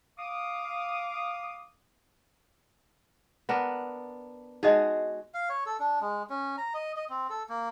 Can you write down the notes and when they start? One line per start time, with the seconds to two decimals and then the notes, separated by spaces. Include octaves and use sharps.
0.17 F5 D6 D#6
3.49 B3 D4 A#4
4.63 G#3 D#4 F#4 G#4 D#5
5.34 F5
5.50 C#5
5.66 A4
5.80 D4
6.01 G#3
6.30 C#4
6.58 A#5
6.74 D#5
6.97 D#5
7.10 C4
7.30 A4
7.49 A#3